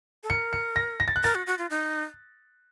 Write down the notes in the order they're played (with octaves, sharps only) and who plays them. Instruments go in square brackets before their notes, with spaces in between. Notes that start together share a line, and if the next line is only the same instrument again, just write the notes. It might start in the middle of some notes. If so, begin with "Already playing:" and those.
[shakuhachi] A4
[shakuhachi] A#4 [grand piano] C#7
[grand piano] C#7
A#6
A#6
A6
F#6
[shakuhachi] A#4 [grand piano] A6
[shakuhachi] F#4
F#4
F4
D#4